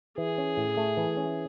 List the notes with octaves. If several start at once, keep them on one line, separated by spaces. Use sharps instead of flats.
E3 G#4
C#4
A2
A3
E3
C#4